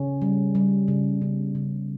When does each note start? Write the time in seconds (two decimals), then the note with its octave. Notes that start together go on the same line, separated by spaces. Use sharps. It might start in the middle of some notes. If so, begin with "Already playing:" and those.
Already playing: C#3 C#4
0.22 G3
0.55 G3
0.88 C#3
1.22 C#3 B3
1.55 C#3